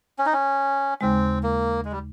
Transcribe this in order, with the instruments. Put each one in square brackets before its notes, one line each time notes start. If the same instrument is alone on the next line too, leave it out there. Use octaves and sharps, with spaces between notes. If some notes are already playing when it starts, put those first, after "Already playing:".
[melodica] C#4
D#4
C#4
[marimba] D#2 C#3 G#3 [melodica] C4
[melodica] A#3
G#3
G3